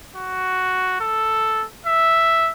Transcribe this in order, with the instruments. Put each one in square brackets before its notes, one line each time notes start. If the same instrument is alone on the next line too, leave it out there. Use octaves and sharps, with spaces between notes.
[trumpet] F#4
A4
E5